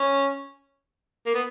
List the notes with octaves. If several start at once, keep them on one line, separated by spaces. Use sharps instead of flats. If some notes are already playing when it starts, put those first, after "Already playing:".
Already playing: C#4
A#3
B3